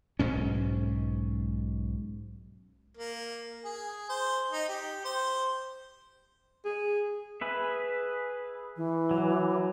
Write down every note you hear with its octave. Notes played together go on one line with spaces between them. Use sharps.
B1 G#2 C#4
A#3
G#4
C5
D#4
G4
C5
G#4
G#4 B4 E5
E3
F#3